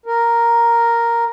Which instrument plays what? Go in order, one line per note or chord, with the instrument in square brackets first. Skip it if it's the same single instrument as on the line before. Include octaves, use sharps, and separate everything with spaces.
[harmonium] A#4